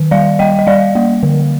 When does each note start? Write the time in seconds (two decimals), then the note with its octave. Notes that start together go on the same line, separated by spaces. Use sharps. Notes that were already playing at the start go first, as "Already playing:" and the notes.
Already playing: D#3
0.11 G3 D5 F5
0.39 G3 D#5 G5
0.59 D#5
0.67 G3 D5 F5
0.95 A#3
1.23 D3